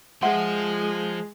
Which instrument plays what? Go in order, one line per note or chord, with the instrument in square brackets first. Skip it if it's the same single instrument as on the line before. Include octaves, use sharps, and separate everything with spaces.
[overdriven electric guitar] F3 [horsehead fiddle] G#3 [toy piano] E5 F#5 C6